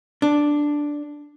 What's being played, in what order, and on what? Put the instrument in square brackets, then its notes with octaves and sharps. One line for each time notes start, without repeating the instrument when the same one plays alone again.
[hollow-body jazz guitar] D4